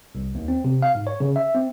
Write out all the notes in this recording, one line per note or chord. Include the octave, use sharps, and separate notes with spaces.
C2
D#2
C4
C3
F5
G#2
C#5
C#3
E5
C4